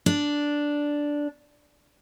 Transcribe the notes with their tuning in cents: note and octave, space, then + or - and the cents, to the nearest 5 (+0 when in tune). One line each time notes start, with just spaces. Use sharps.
D4 -5